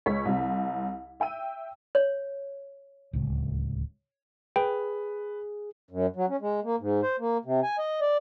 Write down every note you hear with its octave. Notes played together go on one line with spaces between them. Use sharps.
C#2 C#5 B6
C2 C3
E5 G5 E6 D#7
C#5
D1 C#2
G#4 B4 G5
F#2
F#3
C#4
G#3
A#3
G#2
C5
A#3
C3
G#5
D#5
D5